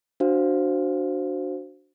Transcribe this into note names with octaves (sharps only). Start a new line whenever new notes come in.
D4 F#4 C5 F5